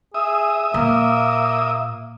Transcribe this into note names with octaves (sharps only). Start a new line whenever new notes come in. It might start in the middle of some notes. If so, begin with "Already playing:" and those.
G#4 E5 D#6
A#2 A#3